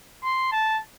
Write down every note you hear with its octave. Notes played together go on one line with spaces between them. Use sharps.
C6
A5